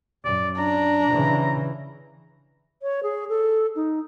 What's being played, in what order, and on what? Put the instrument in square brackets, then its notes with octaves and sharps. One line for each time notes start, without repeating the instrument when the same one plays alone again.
[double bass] F#2 [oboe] D5
[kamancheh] D4 [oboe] A#5
[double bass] C#3 E3
[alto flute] C#5
G#4
A4
D#4